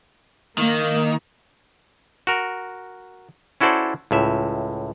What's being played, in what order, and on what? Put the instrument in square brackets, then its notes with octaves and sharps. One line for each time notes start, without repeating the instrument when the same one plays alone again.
[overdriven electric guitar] D#3 [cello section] A#3
[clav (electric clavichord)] F#4 A#4
C#4 E4 F#4 A4 C5 D5
C#2 A2 E5